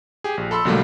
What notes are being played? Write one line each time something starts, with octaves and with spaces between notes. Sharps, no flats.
G4 G#4
A#1
A4 B5 C6 E6
B1 D3 F#3 G3 A3 A#3